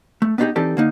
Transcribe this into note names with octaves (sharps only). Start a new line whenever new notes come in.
A3
B3 D4 D#4 F4 G4 G#4
E3 C4 D#4 G4 A4 D5
D3 A#3 D#4